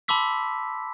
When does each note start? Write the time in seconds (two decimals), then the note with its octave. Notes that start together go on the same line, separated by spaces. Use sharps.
0.08 A5 B5 C6 D6 E6 B6